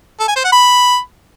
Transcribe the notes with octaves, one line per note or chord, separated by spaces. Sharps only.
A4
G#5
C5
F#5
B5